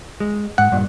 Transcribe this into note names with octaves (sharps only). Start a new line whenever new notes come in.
G#3
G#2 F#5
G2 A#2